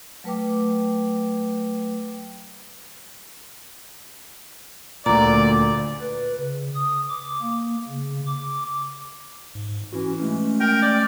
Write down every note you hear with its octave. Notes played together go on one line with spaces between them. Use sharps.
F#3 A3 B4 G5 D6
D2 A#2 D5 A#5
B4
C#3
D#6
D6
A#3
C#3
D6
G#2
E3 C#4 E4 F#4
G#3 A3 C#4
A#4 G5
D5